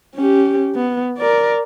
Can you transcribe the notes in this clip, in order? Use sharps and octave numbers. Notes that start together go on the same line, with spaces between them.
C#4 G4
B3
A#4 D5